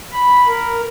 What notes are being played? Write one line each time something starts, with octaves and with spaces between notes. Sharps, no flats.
B5
A#4